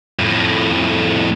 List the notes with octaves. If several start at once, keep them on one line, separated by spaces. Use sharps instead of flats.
F2 A2